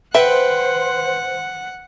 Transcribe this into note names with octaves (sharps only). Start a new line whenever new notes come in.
B4 C5 E5 F#5 G5